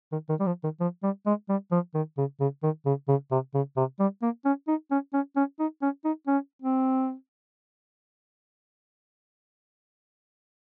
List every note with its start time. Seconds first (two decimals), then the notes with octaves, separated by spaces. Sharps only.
0.12 D#3
0.29 D#3
0.40 G3
0.47 F3
0.64 D#3
0.80 F3
1.03 G3
1.26 G#3
1.49 G3
1.72 F3
1.95 D#3
2.18 C#3
2.40 C#3
2.63 D#3
2.86 C#3
3.08 C#3
3.32 C3
3.54 C#3
3.77 C3
4.00 G3
4.22 A#3
4.45 C#4
4.68 D#4
4.91 C#4
5.14 C#4
5.36 C#4
5.59 D#4
5.82 C#4
6.05 D#4
6.27 C#4
6.62 C4